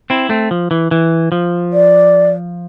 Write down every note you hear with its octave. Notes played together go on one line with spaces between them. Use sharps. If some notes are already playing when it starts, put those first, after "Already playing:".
C4 E4
A3 C4
F3
E3
E3
F3
D5